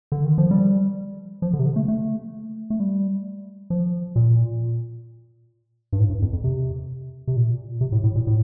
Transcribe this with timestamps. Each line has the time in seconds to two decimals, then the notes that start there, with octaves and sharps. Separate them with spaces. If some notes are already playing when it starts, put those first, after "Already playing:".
0.12 D3
0.25 D#3
0.38 F3
0.51 G3
1.42 F3
1.53 D3
1.59 C3
1.66 D3
1.76 A3
1.88 A3
2.70 A3
2.80 G3
3.70 F3
4.16 A#2
5.92 G2
5.99 A2
6.10 G2
6.22 F2
6.33 F2
6.44 C3
7.27 C3
7.36 A#2
7.81 C3
7.92 A2
8.04 A2
8.15 A#2
8.27 A2